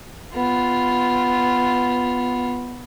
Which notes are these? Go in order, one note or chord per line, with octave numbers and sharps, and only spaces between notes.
B3 F4